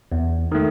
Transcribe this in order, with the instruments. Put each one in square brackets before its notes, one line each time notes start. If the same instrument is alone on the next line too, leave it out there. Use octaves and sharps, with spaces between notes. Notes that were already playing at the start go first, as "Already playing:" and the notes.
[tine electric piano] E2
D#3 A3